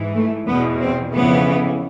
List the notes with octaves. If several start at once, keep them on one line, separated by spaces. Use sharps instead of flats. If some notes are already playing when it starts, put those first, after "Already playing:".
Already playing: G#2 E3
A3
E2 B2 B3
C4
F2 C#3 E3 B3